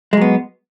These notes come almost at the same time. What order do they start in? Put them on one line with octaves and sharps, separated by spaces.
G#3 F#3 B3